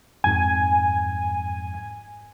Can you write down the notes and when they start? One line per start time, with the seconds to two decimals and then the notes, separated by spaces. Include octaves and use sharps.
0.24 F2 G#2 G#5